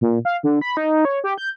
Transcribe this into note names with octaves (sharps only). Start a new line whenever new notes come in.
A#2
F5
D3
B5
D#4
C#5
G4
G6